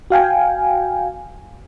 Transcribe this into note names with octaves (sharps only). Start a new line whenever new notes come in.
F#4 F5 G5 G#5